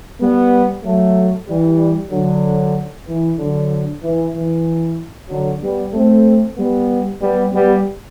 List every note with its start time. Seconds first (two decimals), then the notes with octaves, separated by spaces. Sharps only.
0.20 G3 B3
0.84 F#3 A3
1.48 E3 G3
2.11 D3 F#3
3.07 E3
3.38 D3 F#3
4.02 E3
4.34 E3
5.29 D3 F#3
5.61 G3 B3
5.93 A3 C4
6.57 G3 B3
7.20 G3 B3
7.52 G3 B3